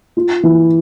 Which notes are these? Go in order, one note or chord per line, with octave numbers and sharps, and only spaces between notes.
F4
E3